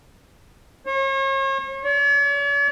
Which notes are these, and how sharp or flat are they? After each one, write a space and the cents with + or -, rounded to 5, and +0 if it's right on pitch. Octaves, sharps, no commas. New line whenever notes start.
C#5 -40
C#5 +45